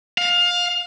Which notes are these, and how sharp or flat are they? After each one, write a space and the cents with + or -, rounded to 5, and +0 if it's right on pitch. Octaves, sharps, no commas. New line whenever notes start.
F5 +20